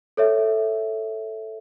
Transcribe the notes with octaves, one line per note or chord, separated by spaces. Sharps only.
A4 C#5 E5